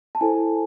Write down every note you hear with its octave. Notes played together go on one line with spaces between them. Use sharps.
A5
E4 A4 C5 G#5